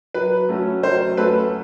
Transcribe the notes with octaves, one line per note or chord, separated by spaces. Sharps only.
F#3 B4
A3 C#4 F#4 A4
F#3 C5
A3 C#4 F#4 A4 B4